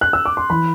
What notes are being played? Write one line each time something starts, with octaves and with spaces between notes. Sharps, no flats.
F#6
E6
D6
C6
E3 B5